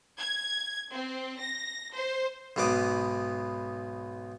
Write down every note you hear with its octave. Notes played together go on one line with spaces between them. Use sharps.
G#6
C4
A#6
C5
B1 G#2 B2 B3 D6 D#6